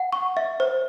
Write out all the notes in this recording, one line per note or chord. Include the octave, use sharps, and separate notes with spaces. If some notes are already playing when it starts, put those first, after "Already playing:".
Already playing: F#5
C#6
E5
C5